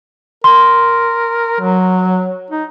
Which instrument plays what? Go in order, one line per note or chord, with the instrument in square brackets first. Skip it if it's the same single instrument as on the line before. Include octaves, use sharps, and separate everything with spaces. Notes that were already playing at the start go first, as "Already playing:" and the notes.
[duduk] A#4 [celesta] C6
[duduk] F#3
D#4